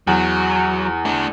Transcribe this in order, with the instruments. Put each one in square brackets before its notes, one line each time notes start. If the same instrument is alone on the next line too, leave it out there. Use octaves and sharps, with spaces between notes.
[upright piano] E2 [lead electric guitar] F#3
[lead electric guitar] A3 D4